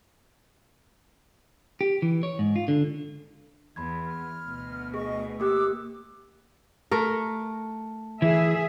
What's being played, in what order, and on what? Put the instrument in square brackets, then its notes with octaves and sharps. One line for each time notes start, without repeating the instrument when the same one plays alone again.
[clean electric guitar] G4
E3
C#5
G#2
F4
D3
[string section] E2 [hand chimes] B5 C6 G#6
[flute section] F6
[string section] D2 B2
[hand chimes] G#4 [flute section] D#5 C#6
[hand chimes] A#3 G4 F#6 [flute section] D6 E6
[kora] A3 A#4
[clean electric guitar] E3 [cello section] G#4 E5